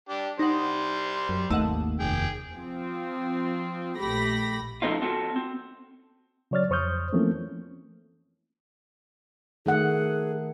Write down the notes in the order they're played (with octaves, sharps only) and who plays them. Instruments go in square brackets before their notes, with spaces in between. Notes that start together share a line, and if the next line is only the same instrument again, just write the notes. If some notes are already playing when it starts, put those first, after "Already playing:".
[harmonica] D4 G4
[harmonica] G3 C5 [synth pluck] D#4 F#5
[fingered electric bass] F#2
[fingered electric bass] G#1 D#2 A#3 [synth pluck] A3 D#5 F#5
[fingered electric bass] F1 D#2 [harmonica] G#4 G5
[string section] F3 C4
A#1 A3 G4 B5 A#6
[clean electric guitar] C#3 F3 A3 C4 D#4 F4
C4 F4 F#4 A4
C4
[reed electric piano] C#3 F#3 C#5 D5 F6 A6
F2 C5 C#6 D#6 F6 G6
E3 F3 A3 A#3 C4 C#4
[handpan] D#3 A3 F#5 [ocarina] G#4